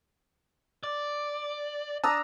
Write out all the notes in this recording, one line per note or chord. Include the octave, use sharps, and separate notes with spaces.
D5
D4 A5 A#5 D#6 E6